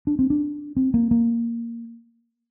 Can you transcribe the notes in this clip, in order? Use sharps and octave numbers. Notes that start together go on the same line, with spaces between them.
D4
C4
D4
C4
A#3
A#3